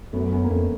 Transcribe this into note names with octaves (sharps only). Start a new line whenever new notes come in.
F#2 A3 B3
B3 C#4
A#3
F2 A3 B3